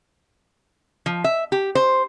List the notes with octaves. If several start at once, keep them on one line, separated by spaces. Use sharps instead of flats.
F3
E5
G4
C5